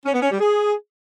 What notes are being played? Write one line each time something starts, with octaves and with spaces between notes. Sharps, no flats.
C#4
B3
C#4
G3
G#4